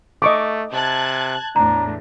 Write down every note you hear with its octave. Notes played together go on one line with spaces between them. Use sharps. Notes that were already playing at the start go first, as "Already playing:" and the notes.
A3 D#5 C#6 D6
C3 A5 F#6 G#6
E2 A2 D4 A#5